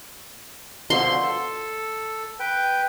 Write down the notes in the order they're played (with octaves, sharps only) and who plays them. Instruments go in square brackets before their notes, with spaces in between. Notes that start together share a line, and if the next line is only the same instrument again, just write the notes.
[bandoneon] B2 D3 F3 [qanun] C6
[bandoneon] A4
B4 G5